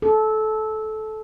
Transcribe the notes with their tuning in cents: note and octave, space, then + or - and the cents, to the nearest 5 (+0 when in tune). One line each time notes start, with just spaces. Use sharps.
A4 -20